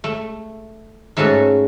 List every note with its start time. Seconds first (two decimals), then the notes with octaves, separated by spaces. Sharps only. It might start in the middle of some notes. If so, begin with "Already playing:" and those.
0.04 A3
1.17 G#2 A3 C#4 F#4 A4